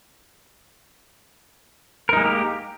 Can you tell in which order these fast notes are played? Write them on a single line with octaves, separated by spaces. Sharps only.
A#4 D#4 G#3 A#3 G4